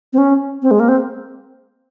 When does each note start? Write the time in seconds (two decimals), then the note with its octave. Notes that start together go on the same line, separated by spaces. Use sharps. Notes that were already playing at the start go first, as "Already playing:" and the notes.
0.13 C4
0.18 C#4
0.62 C4
0.71 G#3
0.80 A#3
0.88 C4